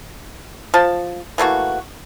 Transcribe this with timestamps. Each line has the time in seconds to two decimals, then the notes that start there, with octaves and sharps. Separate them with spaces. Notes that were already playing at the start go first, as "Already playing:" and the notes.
0.74 F3 A5
1.38 E3 A3 A#3 F#4